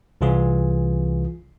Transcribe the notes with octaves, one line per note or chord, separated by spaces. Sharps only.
C2 E3 F4 G#4